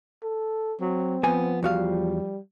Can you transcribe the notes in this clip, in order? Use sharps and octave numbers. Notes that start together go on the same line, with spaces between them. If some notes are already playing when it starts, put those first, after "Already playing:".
A4
F#3 C4
F3 B3 G#5
E2 G3 F#4 F5